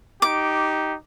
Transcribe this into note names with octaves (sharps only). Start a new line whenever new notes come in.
D#4 G4 D6